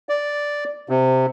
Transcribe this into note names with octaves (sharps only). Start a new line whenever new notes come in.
D5
C3